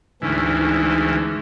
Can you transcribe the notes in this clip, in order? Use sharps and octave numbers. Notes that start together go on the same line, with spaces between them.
D2 G#2 D3 E3 C#4 E4